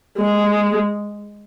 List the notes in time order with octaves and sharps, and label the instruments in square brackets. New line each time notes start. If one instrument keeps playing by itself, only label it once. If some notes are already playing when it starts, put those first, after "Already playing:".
[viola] G#3